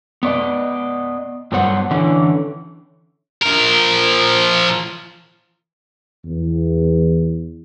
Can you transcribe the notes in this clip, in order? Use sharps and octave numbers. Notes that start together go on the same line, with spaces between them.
B3 D5 D#5
G2 F#3 B3 C5 F#5
D3 E3 C#4
F3 A#4
E2